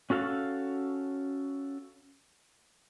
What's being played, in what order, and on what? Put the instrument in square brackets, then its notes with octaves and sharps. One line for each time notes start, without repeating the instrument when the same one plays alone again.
[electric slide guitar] C#4 F#4 A4 F5